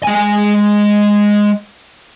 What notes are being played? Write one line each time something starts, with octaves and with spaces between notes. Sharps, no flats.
G#3 G#5